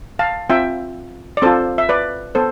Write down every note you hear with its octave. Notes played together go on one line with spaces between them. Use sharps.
F5 A5
C4 F4 E5 G5
D5
C4 F4 A4 C5
E5
B4 D5
B3 A4 C5